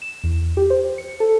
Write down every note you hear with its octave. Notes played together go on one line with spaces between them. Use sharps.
E7
E2
G4
C5
C#7
A4